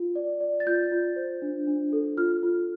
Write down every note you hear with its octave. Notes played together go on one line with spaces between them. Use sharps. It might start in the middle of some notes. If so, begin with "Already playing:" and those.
Already playing: F4
D5
D5
A6
F4 G6
F4
C5
D4
D4
A4
F4 F6
F4